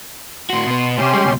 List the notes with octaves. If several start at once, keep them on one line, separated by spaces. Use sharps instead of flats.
A2 F#4 C6
B2 B3
A2 C3 C#4 G4 C6
G3 G#3
C#2 B2